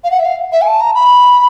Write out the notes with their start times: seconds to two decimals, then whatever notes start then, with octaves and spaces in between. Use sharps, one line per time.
0.04 F5
0.11 F#5
0.19 E5
0.25 F5
0.52 E5
0.61 G#5
0.67 A5
0.81 A#5
0.95 B5